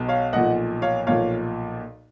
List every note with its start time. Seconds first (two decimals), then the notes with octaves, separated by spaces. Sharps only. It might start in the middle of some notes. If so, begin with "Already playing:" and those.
Already playing: B1 B2
0.08 C#5 F5
0.33 B1 A#2 F3 D#5 F#5
0.82 C#5 F5
1.07 B1 A#2 F3 C#5 F5